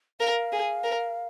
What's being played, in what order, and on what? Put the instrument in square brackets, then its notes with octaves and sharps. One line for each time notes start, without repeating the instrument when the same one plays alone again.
[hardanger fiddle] A#4 [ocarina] F5
[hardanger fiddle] G#4
A#4